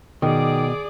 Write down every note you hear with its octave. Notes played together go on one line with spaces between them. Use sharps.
B2 D#3 G#4 D5 D6